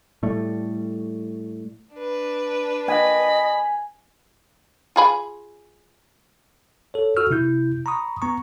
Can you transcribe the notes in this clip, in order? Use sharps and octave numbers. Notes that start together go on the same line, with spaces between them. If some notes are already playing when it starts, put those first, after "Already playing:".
A2 G3 A3
D4 B4
D#5 G#5 B5
F4 G#4 B5
A4 C#5
F#4 A4 C#6 E6 F6
C3 E4 G6
A#5 B5 C#6 D#6
B3 A#5 C#6